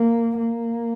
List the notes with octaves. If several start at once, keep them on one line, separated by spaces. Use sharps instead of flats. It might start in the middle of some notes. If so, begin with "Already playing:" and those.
Already playing: A#3
A#3